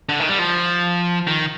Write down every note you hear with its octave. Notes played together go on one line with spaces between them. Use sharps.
D3
D#3
G3
F3
D#3